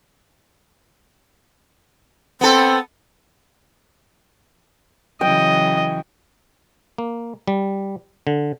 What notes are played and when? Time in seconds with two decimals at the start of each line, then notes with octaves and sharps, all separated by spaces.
2.41 B3 C4 A4
5.21 C#3 E3 F#3 D#5 G5
6.98 A#3
7.47 G3
8.27 D3